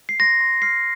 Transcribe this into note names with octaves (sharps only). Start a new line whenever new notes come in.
C7
C6 A#6
C6
F6 C7